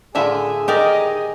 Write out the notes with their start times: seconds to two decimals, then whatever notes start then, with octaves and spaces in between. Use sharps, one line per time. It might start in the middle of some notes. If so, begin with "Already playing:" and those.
0.15 A2 D3 D4 F4 G#4 E5 G#5 B5
0.68 D#3 G4 A#4 D5 D#5